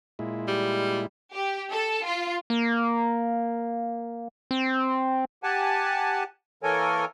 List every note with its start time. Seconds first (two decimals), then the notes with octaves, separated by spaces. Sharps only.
0.19 A#2 G#3 E4
0.48 G3
1.34 G4
1.72 A4
2.05 F4
2.50 A#3
4.51 C4
5.43 G4 F#5 G#5 A5
6.63 E3 A#3 A4 A#4 C#5 G#5